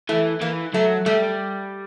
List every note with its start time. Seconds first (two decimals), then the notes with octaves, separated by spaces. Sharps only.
0.09 E3 A3
0.41 E3 A#3
0.74 F#3 A3
1.06 G3 A3